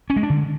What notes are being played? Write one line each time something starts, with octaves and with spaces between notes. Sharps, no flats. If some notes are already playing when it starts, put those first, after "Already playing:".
C#4
G#3
D4
D3